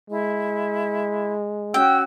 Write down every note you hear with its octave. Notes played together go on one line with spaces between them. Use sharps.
G#3 E4
C#4 F#4 G5 E6